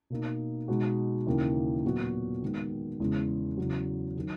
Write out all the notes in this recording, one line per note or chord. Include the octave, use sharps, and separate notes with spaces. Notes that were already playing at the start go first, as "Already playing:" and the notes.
B2 A#3 D#4
B2 G#3 D#4 F#4
D#2 C#3 E3 A#3 E4
A#2 F#3 B3 F#4
D#3 G#3 B3
E2 C#3 G#3
E2 C#3 F#3
D#3 F#3